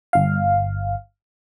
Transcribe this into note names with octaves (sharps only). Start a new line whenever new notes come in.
G1 F5